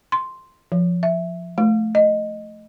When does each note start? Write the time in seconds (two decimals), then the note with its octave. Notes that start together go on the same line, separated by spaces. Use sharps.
0.12 C6
0.72 F3
1.03 E5
1.58 A3
1.95 D#5